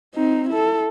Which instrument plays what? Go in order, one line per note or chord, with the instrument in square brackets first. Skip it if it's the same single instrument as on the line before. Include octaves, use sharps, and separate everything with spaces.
[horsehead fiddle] C4 D#4
E4 A4